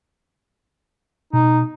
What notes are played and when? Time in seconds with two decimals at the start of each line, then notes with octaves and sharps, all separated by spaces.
1.33 B2 D#4